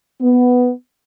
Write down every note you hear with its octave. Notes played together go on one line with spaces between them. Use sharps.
B3